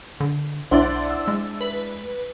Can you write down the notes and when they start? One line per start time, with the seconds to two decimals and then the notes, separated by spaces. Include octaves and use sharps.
0.20 D3
0.71 B1 D4 E4 C5 D5 F#5 C6
1.11 E6
1.28 G#3
1.61 B4